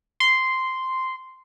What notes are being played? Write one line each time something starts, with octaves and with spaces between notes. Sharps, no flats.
C6